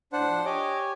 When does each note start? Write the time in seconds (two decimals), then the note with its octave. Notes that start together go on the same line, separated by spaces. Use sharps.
0.13 A2 D4 C5 F#5
0.27 F3
0.45 G4 C#5 D#5 G#5 D6